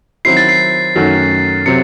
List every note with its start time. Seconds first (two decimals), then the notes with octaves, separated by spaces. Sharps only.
0.25 D#3 F#3 C4 E4 C7
0.37 A6
0.49 C7
0.95 F#2 D#3 F#3 A3
1.66 C3 F#3 C4 C#7